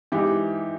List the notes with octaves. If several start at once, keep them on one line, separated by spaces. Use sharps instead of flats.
G#2 E3 G4